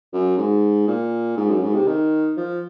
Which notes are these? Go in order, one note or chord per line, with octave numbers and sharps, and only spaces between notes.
F#2
G#2
A#2
G#2
F#2
G#2
C3
D#3
F3